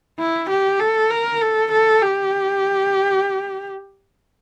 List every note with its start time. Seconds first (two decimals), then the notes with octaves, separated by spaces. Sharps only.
0.19 E4
0.50 G4
0.80 A4
1.10 A#4
1.41 A4
1.72 A4
2.02 G4